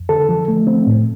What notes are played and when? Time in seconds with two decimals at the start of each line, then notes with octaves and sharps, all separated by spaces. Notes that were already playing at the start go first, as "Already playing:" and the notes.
Already playing: F2
0.09 D3 A4
0.29 F3
0.48 A3
0.67 C4
0.87 A2